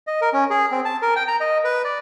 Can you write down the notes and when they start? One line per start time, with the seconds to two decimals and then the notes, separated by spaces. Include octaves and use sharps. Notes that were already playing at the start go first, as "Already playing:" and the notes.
0.07 D#5
0.21 A#4
0.33 C#4
0.50 G#4
0.71 C4
0.85 A5
1.02 A#4
1.16 G5
1.28 A#5
1.40 D#5
1.64 B4
1.84 D5